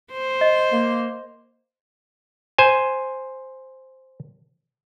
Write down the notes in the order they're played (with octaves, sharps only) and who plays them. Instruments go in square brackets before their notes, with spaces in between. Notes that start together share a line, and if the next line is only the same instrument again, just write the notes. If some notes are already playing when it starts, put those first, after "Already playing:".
[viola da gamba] C5
[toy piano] D#5
[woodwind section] A#3
[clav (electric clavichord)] C5 G#5